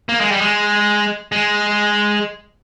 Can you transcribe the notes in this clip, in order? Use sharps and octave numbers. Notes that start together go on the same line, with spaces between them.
A#3
G#3
G3
G#3
G#3